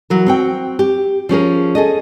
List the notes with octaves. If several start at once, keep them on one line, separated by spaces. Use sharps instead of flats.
E3 F#3 A#4
C4 F#4 G5
G4
F3 C#4 G#4 A#4
G#4 A4 D#5